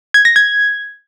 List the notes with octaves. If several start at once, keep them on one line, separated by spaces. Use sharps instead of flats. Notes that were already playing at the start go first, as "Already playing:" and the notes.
G#6
A#6
G#6